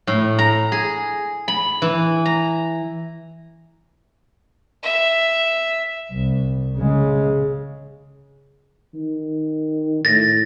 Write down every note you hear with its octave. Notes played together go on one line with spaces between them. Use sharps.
A2
A#5
G#4
B5
E3
A#5
E5
C2
C#3 G#3
D#3
A2 A6 A#6